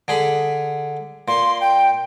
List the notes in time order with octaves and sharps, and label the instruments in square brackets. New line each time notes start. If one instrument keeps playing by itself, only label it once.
[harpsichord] D3 G#4 B5
[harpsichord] A#2 [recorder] C6
[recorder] G5